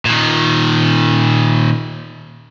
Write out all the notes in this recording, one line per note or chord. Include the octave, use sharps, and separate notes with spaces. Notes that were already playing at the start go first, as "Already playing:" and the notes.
A#2 D#3